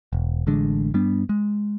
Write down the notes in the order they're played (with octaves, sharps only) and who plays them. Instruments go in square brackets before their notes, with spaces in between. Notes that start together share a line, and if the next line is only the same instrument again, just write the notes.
[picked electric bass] E1
A1 D3 G#3 D4
G2 G3 B3 D4
G#3